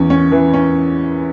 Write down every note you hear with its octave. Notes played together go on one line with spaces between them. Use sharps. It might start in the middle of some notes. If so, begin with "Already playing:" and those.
Already playing: E2 C#4
C#4
E3
C#4